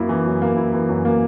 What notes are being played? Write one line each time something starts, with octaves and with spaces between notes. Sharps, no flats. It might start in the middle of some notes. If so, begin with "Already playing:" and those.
Already playing: F#2 A#3 E4
E3
F#2
A#3
E4
E3
F#2
A#3